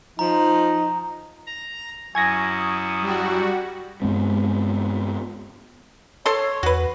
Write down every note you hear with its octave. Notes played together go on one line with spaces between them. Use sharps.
F3 D#4 A#5
A#5
F#2 E4 G#5 C#6 D#6 G#6 A#6
G3 F#4
G2 G#3 B3 C4
A4 C#5 C6
E2 F#4 B4